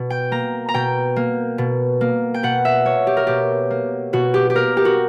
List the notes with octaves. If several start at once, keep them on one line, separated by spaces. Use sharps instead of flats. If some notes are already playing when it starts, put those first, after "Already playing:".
Already playing: B2
G5
A#3 A#5
A#5
B2 G5
A#3
B2
A#3
G5
B2 F#5
E5
A#3 C#5
G4
A#4
B2 G4
A#3
B2 F#4
G4
G4
A#3 A#4
G4
F#4